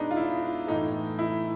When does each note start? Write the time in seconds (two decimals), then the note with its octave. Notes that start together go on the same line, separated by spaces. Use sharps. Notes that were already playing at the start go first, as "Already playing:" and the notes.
Already playing: B2 G#3 B3 D4 D#4
0.11 F4
0.17 E4
0.67 A2 E3 A3 D#4
1.19 E4